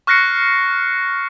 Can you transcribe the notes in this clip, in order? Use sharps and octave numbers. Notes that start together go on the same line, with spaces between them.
C#6 F6 F#6 A#6 C7 C#7